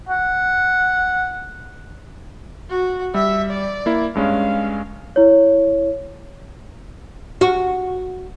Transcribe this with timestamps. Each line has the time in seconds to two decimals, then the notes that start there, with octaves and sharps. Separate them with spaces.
0.09 F#5
2.70 F#4
3.14 G3 E5
3.51 D5
3.86 A#3 E4
4.15 G2 G#3 C#4 F5
5.16 E4 C#5
7.41 F#4